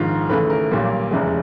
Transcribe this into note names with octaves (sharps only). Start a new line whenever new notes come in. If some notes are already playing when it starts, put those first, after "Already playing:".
Already playing: A#1 G#2 D#3 F4
D#2 C#3 E3 A3 B4
A#4
B1 A#2 G3 A#3
F1 E2 C#3 E3 G#3